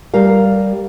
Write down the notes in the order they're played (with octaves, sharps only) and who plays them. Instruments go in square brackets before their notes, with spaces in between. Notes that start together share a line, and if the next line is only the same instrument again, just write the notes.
[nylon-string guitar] G3 G4 A#4 F5